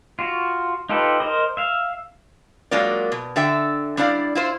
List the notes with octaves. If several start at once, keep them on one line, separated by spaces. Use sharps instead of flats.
F4 F#4
D#4 F4 G4 A4 B4
A#4 C5 D#5
E5 F5
F#3 G#3 A#3 F4 A#4 D5
B2
D3 A4 E5 G5
G3 D4 E4 D5 F5
E4 F4 C5